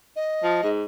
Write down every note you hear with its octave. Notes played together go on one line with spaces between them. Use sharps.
D#5
F3
G#2